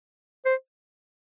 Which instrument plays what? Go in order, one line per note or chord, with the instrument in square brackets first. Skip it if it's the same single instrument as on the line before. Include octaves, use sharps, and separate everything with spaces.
[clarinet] C5